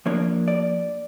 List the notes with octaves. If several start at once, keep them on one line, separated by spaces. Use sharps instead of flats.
F3 A#3 D4 C#5
D5